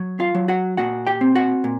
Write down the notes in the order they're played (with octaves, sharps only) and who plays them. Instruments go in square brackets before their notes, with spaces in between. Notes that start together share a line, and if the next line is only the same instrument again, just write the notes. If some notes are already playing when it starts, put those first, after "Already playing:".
Already playing: [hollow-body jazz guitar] F#3
F4 F5
F#3
F#4 F#5
A#2 F#4 F#5
G4 G5
C4
F#4 F#5
A#2